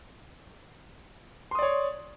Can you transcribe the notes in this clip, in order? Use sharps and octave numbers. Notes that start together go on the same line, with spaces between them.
C#5 D5 C6 D#6